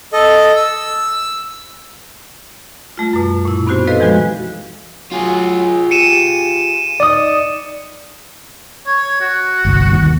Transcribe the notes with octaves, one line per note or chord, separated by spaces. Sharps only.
A4 D#5
E6
G3 A3 F4
F#2 B2
A#2 E4
B3 C4 D#4 F#4 G4 C5
F#4 A4 B4 C5 D#5 F5
E3 F3 G#3 F#4
F#3 F4 G#4
G4 C#7 D#7 E7
D#4 D5 D#6
C#5
F#4
G1 C2
D#2